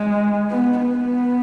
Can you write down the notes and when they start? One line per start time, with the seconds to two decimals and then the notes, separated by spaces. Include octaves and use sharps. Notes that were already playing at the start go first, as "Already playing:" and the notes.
Already playing: G#3
0.51 B3
0.80 B3